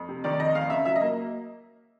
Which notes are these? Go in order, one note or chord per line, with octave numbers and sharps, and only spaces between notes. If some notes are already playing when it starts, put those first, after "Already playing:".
Already playing: F2
C3
D#3 D5
F2 D#5
E2 F5
C#3 E5
F#3 E5
D#5
A#3